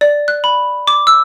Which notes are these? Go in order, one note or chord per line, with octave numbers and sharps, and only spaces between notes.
D5
F#6
B5
D6
E6